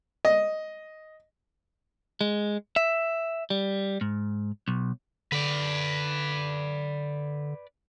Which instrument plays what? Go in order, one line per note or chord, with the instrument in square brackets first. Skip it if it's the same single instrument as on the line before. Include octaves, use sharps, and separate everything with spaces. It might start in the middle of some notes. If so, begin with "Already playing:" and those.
[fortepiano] D#5
[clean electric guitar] G#3
E5
G3
G#2
B1
[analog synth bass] D3 [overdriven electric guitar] B4 D5